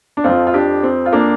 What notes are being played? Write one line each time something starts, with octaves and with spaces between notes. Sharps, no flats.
D4
F2 F3 C4 F4
F4
D4 G4
C4
F4
A#3 D4